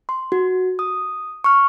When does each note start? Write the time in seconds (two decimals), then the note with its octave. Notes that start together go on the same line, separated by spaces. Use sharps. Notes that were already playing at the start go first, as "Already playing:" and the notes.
0.09 C6
0.32 F#4
0.79 D#6
1.44 C#6 F6